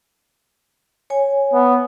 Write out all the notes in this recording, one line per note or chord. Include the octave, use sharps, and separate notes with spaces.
C#5 G#5
B3